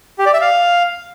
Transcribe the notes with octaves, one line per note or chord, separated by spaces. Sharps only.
G4
D5
E5
F5